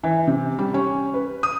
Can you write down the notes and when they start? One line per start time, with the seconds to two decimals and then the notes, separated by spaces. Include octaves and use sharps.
0.03 E3
0.27 C3
0.58 G3
0.74 C#4
1.14 B4
1.43 D#6